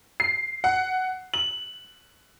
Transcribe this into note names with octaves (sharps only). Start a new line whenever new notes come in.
C7
F#5
F#7